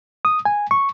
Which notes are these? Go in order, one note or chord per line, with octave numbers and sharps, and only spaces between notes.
D#6
G#5
C#6